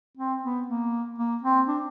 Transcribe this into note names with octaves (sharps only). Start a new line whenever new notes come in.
C4
B3
A#3
A#3
C4
D4